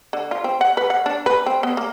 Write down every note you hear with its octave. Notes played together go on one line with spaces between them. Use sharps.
D3
F4
C4
F#5
B4
F#5
D4
B4
C4
B3
A#3